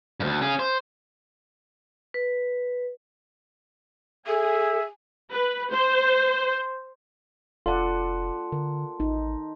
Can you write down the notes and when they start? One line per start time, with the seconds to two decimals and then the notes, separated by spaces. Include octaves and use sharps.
0.20 D2 G2
0.41 C#4 G#4
0.59 C5
2.14 B4
4.27 G#4 A4 E5 G#5
5.32 B4
5.71 C5
7.66 F1 F4 A4 D5 F#5 A5 C6
8.52 D3 A#4
9.00 A1 D#4